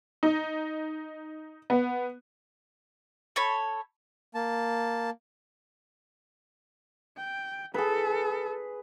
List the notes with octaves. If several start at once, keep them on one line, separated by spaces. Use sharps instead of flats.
D#4
B3
A4 C#5 B5
A#3 A5
G5
G#4 A4 B4